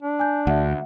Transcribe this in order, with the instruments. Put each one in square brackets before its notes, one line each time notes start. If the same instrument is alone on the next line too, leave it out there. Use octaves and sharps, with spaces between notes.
[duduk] D4
[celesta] G#5 G6
[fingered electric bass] D2 [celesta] E5 F#5